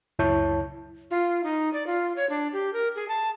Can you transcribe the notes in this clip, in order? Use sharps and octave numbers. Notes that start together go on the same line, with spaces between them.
C#2 F#2 E4 C#5 A5 G6
F4
D#4
D5
F4
C#5
D4
G4
A#4
G#4
A5